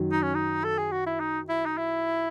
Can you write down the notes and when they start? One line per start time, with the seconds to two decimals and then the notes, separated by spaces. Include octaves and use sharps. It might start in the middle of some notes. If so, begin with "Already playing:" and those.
Already playing: F#2 D#3 F#3
0.12 D#4
0.23 C#4
0.35 D#4
0.64 A4
0.78 G#4
0.92 F#4
1.06 E4
1.20 D#4
1.49 E4
1.66 D#4
1.77 E4